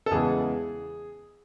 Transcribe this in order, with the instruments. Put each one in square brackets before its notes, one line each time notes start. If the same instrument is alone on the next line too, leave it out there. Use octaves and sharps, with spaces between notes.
[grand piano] A4
E2 C#3 E3 G#3 G#4